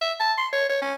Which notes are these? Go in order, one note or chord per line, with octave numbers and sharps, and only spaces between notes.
E5
A5
C6
C#5
C#5
C#4